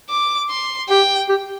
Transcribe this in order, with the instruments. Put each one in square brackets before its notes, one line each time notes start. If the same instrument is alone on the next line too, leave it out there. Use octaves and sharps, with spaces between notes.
[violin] D6
C6
[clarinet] G4 [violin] G5
[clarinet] G4